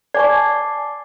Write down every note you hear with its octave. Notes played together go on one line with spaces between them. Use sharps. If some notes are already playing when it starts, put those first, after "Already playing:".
D5 G#5 A5 C#6 D6 C7